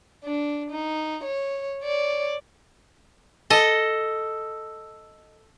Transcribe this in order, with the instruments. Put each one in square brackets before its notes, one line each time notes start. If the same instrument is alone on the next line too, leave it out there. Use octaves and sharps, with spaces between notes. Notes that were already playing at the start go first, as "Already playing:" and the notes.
[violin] D4
D#4
C#5
C#5 D5
[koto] A4 D#5